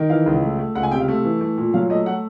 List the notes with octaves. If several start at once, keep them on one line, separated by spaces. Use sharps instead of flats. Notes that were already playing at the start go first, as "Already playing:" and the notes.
Already playing: D#3
E3 F5
C#2
A3
A3
C#2 F#5
G#5
C3 G5
F5
A3
E3
A3
A#2
F#3 F5
A3 D#5
A3 F#5